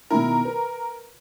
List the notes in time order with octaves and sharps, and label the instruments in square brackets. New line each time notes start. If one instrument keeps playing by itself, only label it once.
[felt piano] B2 D#3 E4 [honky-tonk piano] A#4
[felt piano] B4